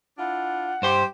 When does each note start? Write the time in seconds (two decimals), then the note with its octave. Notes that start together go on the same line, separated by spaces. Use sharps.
0.18 D4 E4 F4 F#5
0.82 G2 G4 C5 C6